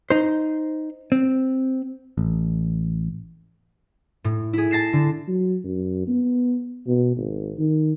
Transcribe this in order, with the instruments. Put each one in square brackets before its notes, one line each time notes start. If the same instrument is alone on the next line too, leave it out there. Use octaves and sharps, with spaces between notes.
[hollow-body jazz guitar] D#4 C5
C4
[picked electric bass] A1
[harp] A2
E4 G#4
A5 A#6 C7 E7
D3
[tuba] F#3
F#2
B3
B2
G#1
D#3